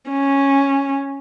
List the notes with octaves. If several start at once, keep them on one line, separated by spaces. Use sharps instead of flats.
C#4